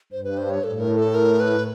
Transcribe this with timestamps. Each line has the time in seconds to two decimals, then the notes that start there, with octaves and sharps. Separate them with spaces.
0.12 G2 C5
0.24 B4
0.38 C5
0.50 C#5
0.64 A2 A4
0.80 A#4
0.98 A4
1.15 A#4
1.40 B4